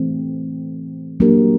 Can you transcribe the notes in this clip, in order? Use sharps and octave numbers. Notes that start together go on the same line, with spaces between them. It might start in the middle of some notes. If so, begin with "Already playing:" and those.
Already playing: E3 A3 C4
F#3 A#3 D4 G4 A#4